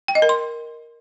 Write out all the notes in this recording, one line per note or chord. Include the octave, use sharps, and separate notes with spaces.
G5
D#5
A#4
C6